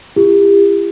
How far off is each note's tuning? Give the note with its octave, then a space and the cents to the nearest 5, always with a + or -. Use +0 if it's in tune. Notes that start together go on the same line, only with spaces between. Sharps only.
E4 +45 G4 +40